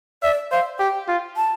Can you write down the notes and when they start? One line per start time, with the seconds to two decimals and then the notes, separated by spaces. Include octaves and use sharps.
0.23 D5 E5
0.52 C5 F5
0.79 G4 G5
1.08 F4
1.37 A5